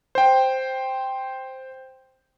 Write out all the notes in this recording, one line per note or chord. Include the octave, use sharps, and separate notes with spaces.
C5 G5